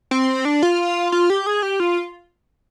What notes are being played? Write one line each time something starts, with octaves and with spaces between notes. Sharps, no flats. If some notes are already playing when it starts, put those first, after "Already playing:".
C4
D4
F4
F4
G4
G#4
G4
F4